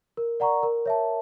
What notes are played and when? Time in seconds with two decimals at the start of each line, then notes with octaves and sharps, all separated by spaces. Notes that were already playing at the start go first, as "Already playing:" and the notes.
0.17 A#4
0.40 D5 F#5 A#5 C#6
0.63 A#4
0.86 C#5 E5 A5